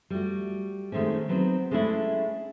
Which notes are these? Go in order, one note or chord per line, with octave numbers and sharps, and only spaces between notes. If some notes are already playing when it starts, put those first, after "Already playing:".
G3 A3 F#4
D#3 G#3 A3 C4 C#4
F#3 B3 C4 D#4
G#3 A3 C#4 D4 E4 G#4